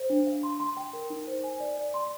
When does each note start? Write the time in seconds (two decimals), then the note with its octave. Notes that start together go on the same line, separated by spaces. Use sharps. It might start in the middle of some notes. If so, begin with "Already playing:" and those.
Already playing: C5
0.10 D4
0.27 F5
0.43 C6
0.60 C6
0.77 G5
0.93 A#4
1.10 D#4
1.27 C5
1.44 G#5
1.60 D5
1.77 D5
1.94 C6